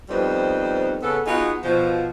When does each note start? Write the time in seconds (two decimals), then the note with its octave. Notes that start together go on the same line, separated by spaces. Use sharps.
0.09 F2 G3 B3 D#4 C5
1.02 C#3 B3 A4
1.25 B3 D#4 F4 F#4 G#4
1.63 B2 F3